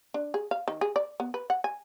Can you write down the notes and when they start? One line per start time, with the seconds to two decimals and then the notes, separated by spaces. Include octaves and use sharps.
0.14 D4
0.34 G#4
0.51 F5
0.68 D#3
0.81 G#4
0.96 D5
1.20 B3
1.34 B4
1.50 F#5
1.64 G#5